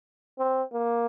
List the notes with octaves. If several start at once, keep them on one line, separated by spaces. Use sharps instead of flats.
C4
A#3